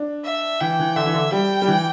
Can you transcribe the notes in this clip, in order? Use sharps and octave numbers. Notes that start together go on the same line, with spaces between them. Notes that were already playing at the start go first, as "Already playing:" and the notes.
Already playing: D4
E5
E3 G5
E3
D3 E5
E3
D3
G3 G5
G3
E3